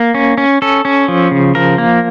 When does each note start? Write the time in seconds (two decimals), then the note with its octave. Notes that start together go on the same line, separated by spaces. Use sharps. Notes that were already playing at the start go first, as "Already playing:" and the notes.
Already playing: A#3
0.14 C#4
0.38 C#4
0.62 C#4 A4
0.85 C#4
1.08 F3
1.31 C#3
1.55 F3 A#4
1.78 A#3